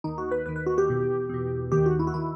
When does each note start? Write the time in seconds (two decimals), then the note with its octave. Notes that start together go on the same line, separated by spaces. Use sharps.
0.04 D#2 D#3 D#4
0.18 F#4
0.31 B4
0.46 D#2 D#3 B4
0.56 B4
0.66 F#4
0.78 G4
0.88 E2 B2
1.29 E2 B2
1.71 D#2 D#3 G4
1.86 F#4
1.99 E4
2.07 F#4
2.14 D#3 E4